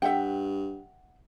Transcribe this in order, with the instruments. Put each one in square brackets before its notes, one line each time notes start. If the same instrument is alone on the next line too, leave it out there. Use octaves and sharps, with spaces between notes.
[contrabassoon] G2 [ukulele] E5 F#5 G5